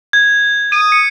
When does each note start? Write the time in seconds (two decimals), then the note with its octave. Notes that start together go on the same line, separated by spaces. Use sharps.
0.13 G#6
0.72 D#6 D#7
0.92 C#7